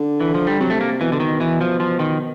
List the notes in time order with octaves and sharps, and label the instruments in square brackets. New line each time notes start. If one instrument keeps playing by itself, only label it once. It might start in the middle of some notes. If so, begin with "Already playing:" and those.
Already playing: [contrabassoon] D3
[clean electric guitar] E3
F3
G3
[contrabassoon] C3 [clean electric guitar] F#3
[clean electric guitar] A3
A#3
[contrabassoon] B2 [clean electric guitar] E3
[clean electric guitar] D3
D#3
E3
F3
F3
D#3